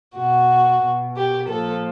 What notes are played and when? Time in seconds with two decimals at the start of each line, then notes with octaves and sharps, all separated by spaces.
0.16 B2 F#4
0.83 B2
1.16 G4
1.49 A#2 F3 A4